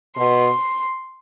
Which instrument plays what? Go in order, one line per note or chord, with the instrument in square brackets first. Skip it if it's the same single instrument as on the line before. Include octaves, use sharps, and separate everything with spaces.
[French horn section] B2 [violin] C6